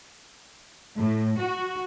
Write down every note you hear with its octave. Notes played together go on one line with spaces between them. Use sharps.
A2
F#4